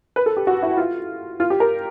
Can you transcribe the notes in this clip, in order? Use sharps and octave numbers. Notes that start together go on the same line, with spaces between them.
B4
A4
G4
F#4
E4
F4
F4
G4
A#4